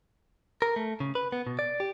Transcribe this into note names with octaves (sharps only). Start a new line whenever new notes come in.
A#4
A3
C#3
B4
B3
B2
D5
G4